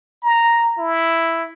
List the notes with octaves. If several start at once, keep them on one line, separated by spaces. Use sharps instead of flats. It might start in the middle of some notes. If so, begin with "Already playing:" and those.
A#5
E4